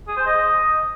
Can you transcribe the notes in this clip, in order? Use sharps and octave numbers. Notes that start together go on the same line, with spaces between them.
G#4
C5
D#5